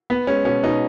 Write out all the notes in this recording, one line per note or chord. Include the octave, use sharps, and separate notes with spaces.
B3
G#3 C#4
B2 C#4
B2 D#4